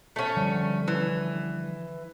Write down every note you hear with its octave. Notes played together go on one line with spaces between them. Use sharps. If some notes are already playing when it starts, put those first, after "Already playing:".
A3 C#4
D3 F3 G3
E3